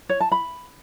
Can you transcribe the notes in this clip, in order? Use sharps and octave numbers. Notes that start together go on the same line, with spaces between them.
C#5
A5
B5